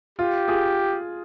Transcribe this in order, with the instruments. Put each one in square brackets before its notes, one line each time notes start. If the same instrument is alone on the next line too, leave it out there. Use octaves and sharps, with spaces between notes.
[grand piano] F4 [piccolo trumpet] G4
[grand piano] F4 G#4